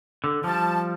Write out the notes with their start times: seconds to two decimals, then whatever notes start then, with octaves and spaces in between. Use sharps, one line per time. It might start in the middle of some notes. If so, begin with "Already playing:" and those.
0.24 D3
0.44 F3 G3 A5